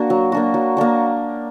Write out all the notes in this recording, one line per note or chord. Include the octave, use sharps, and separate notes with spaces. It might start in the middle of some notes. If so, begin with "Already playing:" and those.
Already playing: A#3 D4 F#4
F#3
A#3 D4 F#4
F#3
A#3 D4 F#4